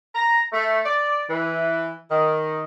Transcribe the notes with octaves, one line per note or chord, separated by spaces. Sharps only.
A#5
A3
D5
E3
D#3